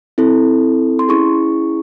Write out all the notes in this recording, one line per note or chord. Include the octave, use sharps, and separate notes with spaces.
C4 E4 A4
C6
C#4 E4 G#4 C#6